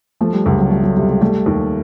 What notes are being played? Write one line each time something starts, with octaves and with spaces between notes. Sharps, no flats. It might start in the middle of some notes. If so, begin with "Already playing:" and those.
F3 A3
G3
C#2 G3
F#3
G3 A3
F#3
C3 G3
G#3
G3 A3
D#2